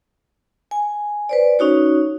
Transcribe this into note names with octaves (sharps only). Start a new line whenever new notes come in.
G#5
B4 C5 D5
C#4 D#4 F#4 C#5